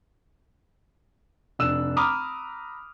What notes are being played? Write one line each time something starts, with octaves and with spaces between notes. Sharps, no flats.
F1 D4 E6 F#6 E7
A#5 B5 D6 D#6 F6